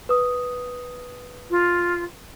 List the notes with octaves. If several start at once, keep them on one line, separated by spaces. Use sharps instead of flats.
B4 D#6
F4